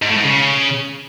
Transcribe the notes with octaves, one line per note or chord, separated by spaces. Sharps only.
G#2
A2
G#2
C#3